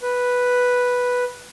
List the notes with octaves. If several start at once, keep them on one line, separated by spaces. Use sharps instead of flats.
B4